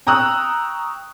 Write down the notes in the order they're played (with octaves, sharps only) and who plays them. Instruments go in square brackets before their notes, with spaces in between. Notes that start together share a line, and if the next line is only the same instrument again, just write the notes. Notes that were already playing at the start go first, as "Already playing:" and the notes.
[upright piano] G5 A#5 C#6 D#6 E6 F#6